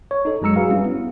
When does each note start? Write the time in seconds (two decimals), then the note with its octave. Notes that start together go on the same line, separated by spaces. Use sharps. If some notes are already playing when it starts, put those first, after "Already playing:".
0.11 C#5
0.25 D#4 A4
0.41 F#2 F#3 G#3 A#5 E6 C#7
0.56 F#4 G#4 B4 F5
0.69 G3 C#4 E4
0.84 B3